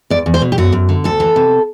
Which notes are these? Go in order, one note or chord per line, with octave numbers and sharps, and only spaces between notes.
E2 D5
E2
C5
B2
G4
F#2 F#4
F#2
D3
D2 A4
E3
C3